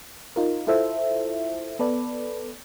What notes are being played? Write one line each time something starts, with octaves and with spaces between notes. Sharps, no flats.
D#4 F4 A#4
E4 F4 A4 C5 E5
B3 A4 B4 D5